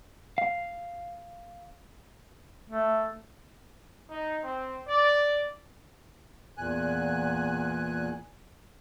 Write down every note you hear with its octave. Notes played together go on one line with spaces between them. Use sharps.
F5
A3
D#4
C4
D5
E2 A#2 G#5 F#6